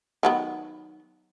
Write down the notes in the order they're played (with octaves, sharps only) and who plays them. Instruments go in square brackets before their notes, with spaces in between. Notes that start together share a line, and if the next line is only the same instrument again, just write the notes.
[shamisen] D#3 F#3 B3